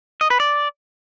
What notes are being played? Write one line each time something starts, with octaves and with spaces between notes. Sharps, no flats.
D#5
B4
D5